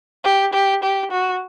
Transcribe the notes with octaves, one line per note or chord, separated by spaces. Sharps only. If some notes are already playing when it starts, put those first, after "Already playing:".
G4
G4
G4
F#4